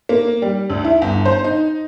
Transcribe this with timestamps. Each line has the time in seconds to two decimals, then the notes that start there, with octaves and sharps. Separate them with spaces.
0.09 A#3
0.42 G3
0.70 D2
0.84 E4
1.02 G1
1.25 C5
1.44 D#4